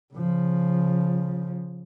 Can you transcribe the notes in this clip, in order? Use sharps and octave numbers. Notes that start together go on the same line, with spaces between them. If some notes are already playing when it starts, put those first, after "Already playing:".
C#3 F3